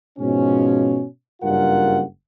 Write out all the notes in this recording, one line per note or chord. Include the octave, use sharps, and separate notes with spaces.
G#2 B2 F3 C#4
F#1 G2 C#3 F4 A#4 F#5